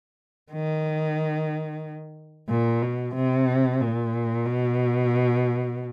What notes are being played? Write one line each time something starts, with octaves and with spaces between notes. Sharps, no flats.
D#3
A#2
B2
C3
A#2
B2